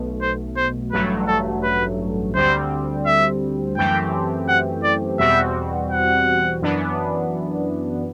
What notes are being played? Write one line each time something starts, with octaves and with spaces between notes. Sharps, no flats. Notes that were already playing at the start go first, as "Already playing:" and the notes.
Already playing: B1 B2 A3
C5
C5
A1 G2 F#3 A3 B4
A4
B4
D2 D3 G3 C4 C5
E5
F#2 E3 A3 C4 G4 G5
F#5
D5
E2 B2 G3 C4 F#4 E5
F#5
F#2 E3 B3 D4